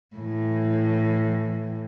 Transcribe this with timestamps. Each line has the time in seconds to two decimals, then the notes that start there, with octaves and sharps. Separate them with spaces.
0.16 A2 E3